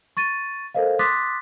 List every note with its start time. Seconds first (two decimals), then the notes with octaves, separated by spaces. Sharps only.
0.17 C#6 A6 D#7
0.75 A4 A#4 C5 D#5 F5
0.99 C6 D6 D#6 F#6 A6 B6